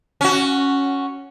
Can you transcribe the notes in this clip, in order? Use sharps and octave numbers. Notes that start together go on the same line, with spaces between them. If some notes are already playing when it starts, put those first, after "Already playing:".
C#4 F#4